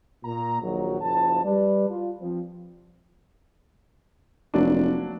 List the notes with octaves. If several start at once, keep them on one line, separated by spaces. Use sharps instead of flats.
A#2 A#5
A#1 D#3 F#3
F#1 F3 A5
G3 B4 D5
F4
F3 C4
F1 F#3 A#3 D4